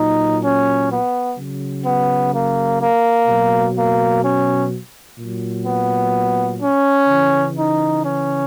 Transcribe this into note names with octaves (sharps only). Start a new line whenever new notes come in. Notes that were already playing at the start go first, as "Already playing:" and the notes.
Already playing: A#2 F#3 D#4
C#4
B3
C#3 F#3
B3
A#3
A#3
B2 F#3
A#3
C#4
A#2 F#3
B3
C#4
C#3 E3
D#4
C#4